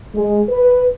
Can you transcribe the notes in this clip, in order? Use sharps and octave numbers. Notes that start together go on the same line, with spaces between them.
G#3
B4